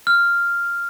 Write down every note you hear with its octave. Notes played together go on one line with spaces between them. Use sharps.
F6